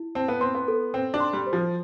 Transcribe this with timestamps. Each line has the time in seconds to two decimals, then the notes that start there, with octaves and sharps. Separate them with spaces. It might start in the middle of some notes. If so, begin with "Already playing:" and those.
Already playing: E4
0.15 C4 A5
0.28 B3
0.41 C4 C6
0.55 B3
0.68 A4
0.94 C4 G5
1.14 D4
1.20 C6
1.33 G3
1.47 C5
1.53 F3